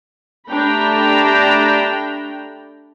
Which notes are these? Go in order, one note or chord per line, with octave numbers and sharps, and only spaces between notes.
A3 D4 G4 G5 A#5 B5